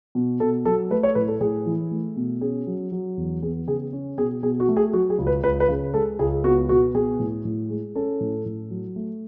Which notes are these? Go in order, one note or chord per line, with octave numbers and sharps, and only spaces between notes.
B2
B2 A4
F#3 A4
A3 B4
C#5
A2 B4
A4
A2 G#4
E3
A3
B2
C#4 G#4
F#3
F#3
E2
B3 G#4
C#3 G#4
C#4
B2 G#4
B2 G#4
F#4
A3
G#4
F#3 F#4
G#4
C#2
B4
C#2 B4
B4
C#3
G#3 A4
C#2 G#4
B3 F#4
B2 F#4
B3 G#4
A2
A2
G#3
C#4 A4
A2
A2
F#3
A3